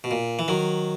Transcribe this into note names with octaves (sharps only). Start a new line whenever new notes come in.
B2
A#2
E3
D#3 F#3